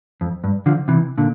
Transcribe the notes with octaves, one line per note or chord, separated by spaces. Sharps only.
F2
G2
D3 F3
C3 E3
A#2 D3